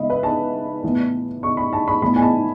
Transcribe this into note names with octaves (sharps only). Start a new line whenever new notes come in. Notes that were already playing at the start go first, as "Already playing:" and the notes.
Already playing: C#3 G#3 B3 D#5 E5 B5
B4
A5
A2 E3 B3
C#6
B5
A5
B5
A2 E3 B3 B5
G#5
A5